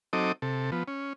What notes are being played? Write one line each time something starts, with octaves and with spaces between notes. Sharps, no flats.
F#3 C4 D#4 A4 D#5 D6
C3 A4
F3 B3
C#4